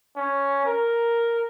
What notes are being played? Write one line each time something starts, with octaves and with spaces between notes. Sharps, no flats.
C#4
A#4